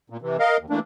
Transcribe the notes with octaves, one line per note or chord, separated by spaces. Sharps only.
A#2
C3 E3
A#4 D#5 F5
D#2
E3 A3 A#3 D4